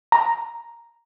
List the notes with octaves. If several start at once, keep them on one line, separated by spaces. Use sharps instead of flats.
A#5